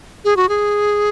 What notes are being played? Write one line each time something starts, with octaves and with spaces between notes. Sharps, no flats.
G#4
F#4
G#4